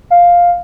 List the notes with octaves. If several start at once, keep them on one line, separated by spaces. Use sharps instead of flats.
F5